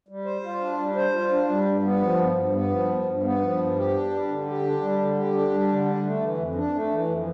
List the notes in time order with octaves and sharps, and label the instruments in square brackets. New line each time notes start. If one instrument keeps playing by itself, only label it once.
[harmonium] G3
C5
F4
D4
G3
C5
F4
D4
G3
G2
B3
F3
G2
G2
B3
F3
G2
G2
B3
F3
G2
G4
D4
G3
D3
G4
D4
G3
D3
G4
D4
G3
D3
D4
A3
E3
F2
D4
A3
E3
F2